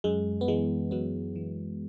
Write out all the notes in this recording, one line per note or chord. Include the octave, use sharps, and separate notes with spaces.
F#2 G#3
B3
E3 G#3
F#2 F#3 B3
E3